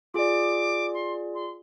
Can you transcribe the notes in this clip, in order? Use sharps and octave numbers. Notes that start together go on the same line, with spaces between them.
F4 G#4 D5 D6
C6
C6